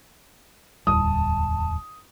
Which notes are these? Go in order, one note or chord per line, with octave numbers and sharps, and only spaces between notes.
D1 E2 G3 A5 D#6